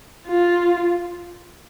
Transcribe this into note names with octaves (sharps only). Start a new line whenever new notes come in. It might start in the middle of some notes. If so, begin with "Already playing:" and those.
F4